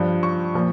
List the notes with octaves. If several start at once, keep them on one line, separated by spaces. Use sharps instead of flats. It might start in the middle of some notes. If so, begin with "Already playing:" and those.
Already playing: G2 F3
C#6
A#2 F3